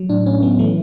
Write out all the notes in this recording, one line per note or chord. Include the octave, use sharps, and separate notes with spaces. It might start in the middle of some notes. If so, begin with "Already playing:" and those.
Already playing: F#3
A2 D4
A2 C#4
F#3 B3
E3 A3